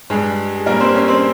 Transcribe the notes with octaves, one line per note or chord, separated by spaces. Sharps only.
G2 G3 G#3 G#4
G#4
G2 G3 A#3 A#4
C4 C5
C#4 C#5
C4 C5